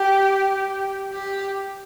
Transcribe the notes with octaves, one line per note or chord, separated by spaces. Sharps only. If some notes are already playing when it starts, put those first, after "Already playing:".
Already playing: G4
G4